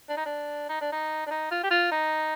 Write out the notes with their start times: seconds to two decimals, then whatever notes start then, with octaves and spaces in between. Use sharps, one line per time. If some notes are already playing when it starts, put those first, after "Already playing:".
0.09 D4
0.17 D#4
0.26 D4
0.69 D#4
0.81 D4
0.92 D#4
1.27 D4
1.31 D#4
1.51 F4
1.63 G4
1.70 F4
1.91 D#4